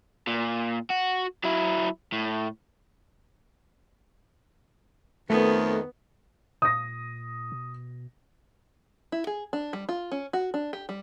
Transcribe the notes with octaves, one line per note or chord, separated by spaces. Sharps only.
A#2
F#4
F#3 E4
A2
F2 D#3 A3 B3
A#2 D#6 A#6
B2
E4
G#4
D4
G3
F4
C#4
F#4
D4
G4
G3